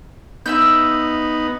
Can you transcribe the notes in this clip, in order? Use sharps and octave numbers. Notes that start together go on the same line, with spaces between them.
B3 D#4 E5 E6 G6